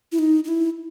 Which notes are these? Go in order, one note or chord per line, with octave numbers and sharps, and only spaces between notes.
E4
D#4
D#4
E4